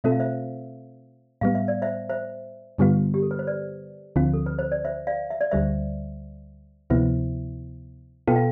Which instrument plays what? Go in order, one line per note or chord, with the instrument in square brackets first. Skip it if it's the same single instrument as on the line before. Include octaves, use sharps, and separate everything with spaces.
[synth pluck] B2 A3 C4 F4 A4 [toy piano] E5
[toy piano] F5
C5 E5
[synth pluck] A2 G3 B3 [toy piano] F5
[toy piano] E5
D5
C5 E5
C5 E5
[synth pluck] G2 D3 G3 B3 F4
[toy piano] G4
A4
B4
C5
B4 D5
[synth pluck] D2 D3 F3 C4 F4
[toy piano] A4
B4
C5
D5
C5 E5
D5 F5
E5
D5
[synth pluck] D2 D3 G3 [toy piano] C5 E5
[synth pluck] D2 C3 F3 B3 E4 [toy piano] C5 E5
[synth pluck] B2 B3 F4 A4 [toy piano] G5
[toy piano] F5